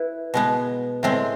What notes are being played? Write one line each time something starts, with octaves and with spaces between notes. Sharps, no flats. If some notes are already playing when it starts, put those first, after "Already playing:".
Already playing: E4 B4
B2 G#3 B3
A2 G#3 C4